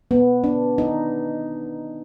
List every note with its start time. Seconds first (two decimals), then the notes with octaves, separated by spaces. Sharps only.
0.11 B3
0.44 D4
0.78 D#4